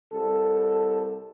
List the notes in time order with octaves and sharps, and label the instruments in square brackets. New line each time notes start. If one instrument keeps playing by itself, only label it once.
[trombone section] C2 A4